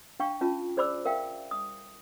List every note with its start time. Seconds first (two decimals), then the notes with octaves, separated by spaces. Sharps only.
0.20 D4 F5 G5 C#6
0.41 C#4 F4 A5
0.77 G#4 C5 D5 B5 D6 E6
1.05 A#4 E5 F5 G5
1.51 D#6